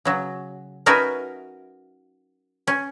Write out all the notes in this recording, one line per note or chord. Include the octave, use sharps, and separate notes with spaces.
C#3 F#3
C#4 D#4 F#4 A#4 B4 E5
C#4